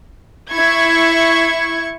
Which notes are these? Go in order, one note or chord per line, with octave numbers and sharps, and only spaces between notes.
E4 C#6 G#6